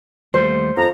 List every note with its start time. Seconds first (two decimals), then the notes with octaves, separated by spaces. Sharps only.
0.34 D#2 G3 A3 C5
0.77 F2 A#5